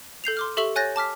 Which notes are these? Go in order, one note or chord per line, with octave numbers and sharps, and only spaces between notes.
A4 G6 C7 F7
C6 D6 F6
G4 A4 E5 C#6 E6 F#7
C#5 G#5 F#6 G6 A6 A#6
A5 D6 F6 B6